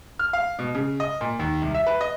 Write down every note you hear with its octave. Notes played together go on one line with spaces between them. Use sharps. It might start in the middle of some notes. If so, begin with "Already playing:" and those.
F6
F5
B2
C#3
D#5
A#2
D#2
C2
E5
B4
D#5